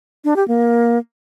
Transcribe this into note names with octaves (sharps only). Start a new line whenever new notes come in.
D4
G4
A#3